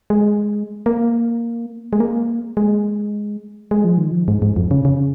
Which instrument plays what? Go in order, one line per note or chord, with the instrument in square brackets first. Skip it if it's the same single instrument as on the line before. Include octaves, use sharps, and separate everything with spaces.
[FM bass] G#3
A#3
G#3
A#3
G#3
G#3
F3
D#3
F3
G#2
G#2
F2
C#3
C#3